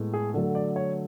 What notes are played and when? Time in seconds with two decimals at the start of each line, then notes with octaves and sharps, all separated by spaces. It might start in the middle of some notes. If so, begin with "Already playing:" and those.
Already playing: A2 G#3 B3
0.14 G#4
0.34 D3 F#3 A3 A4
0.55 D5
0.76 C#5